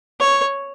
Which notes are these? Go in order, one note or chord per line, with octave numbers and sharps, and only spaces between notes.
C#5